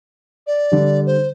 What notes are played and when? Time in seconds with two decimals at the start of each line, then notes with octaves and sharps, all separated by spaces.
0.46 D5
0.72 D3 G3
1.06 C5